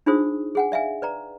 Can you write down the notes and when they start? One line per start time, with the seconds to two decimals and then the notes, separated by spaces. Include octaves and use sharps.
0.06 D4 D#4 F4 G#4 C5 D#6
0.55 G#4 F#5 G#5
0.72 D5 E5 F5 G#5
1.02 B4 D5 A#5